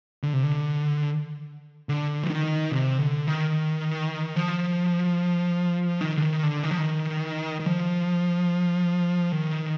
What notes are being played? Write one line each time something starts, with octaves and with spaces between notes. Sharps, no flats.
D3
C3
D3
D3
F3
D#3
C3
D3
D#3
F3
D#3
D3
D#3
D3
D#3
F3
D#3
D#3
F3
D#3